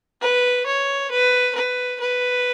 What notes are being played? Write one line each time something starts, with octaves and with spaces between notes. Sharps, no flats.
B4
C#5
B4
B4
B4